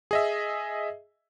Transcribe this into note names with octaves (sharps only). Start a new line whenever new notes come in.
G#4 D#5 E5